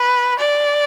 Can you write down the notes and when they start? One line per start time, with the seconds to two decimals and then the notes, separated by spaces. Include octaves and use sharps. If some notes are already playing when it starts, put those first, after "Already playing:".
Already playing: B4
0.40 D5